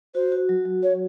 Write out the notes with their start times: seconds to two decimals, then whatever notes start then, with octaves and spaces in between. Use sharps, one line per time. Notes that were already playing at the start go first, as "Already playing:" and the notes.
0.14 F#4 C5
0.32 F#4
0.49 F#3
0.65 F#3
0.83 F#4 C#5